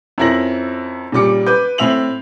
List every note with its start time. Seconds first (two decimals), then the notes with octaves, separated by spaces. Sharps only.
0.18 F2 C#4 E4 A#4 A#6 F#7
1.12 A#2 C#3 G3 D6 C#7
1.47 B4 D6 G6
1.78 A2 C4 E5 F7 F#7